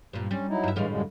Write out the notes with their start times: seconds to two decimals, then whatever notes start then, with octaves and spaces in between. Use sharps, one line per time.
0.13 G2 A#2
0.31 G3 C#4
0.49 F#3 D#4 E4
0.63 G2 E5
0.76 A2 E3 G3 G#3 F5
0.89 F#2 D3 G#3